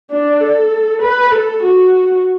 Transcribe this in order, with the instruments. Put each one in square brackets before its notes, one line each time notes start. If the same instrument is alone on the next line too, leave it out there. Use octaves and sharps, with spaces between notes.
[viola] D4
A4
B4
A4
F#4